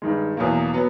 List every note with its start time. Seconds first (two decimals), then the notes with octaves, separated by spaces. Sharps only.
0.02 G2 D#3 G#3
0.37 E2 B2 F#3 A#3
0.73 F#3 B3